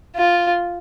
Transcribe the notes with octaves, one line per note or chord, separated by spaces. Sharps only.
F4